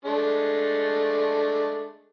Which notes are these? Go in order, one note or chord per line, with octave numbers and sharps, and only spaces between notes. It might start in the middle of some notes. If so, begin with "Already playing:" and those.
G#3 A3 D4